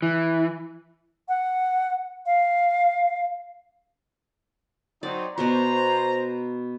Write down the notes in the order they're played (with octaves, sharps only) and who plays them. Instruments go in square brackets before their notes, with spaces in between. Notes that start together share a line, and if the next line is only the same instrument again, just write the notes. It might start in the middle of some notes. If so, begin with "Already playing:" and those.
[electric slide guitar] E3
[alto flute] F#5
F5
[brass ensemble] F#3 C4 D#4 [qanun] D5
[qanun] B2 B3 F#4 [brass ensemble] C5 A#5